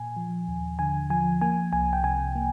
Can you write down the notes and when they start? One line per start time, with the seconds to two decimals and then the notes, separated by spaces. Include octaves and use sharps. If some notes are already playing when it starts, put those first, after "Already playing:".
Already playing: A#2 G#5
0.17 F3
0.48 D#2
0.79 D3 G#5
1.10 F3 G#5
1.41 A#3 G#5
1.73 C2 G#5
1.93 G5
2.04 C3 G#5
2.35 A#3